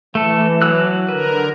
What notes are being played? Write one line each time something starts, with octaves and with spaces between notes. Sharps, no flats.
E3 A3 A4
F#3 E6 F#6
D3 A#4 B4